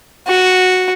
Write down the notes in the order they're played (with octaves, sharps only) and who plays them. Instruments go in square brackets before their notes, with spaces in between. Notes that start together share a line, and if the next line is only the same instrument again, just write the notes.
[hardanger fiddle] F#4